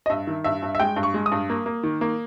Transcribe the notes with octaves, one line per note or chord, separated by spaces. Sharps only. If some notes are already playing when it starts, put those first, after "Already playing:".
D#5
G2 E5
D#3
G2 E5
G2
E5
G#3 G5
G2
C#6
G#3
D#6
G2
A#3
A#3
D#3
A#3